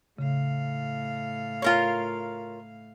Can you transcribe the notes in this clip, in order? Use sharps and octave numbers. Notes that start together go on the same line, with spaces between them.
A2 C#3 F5
F4 A#4 C#5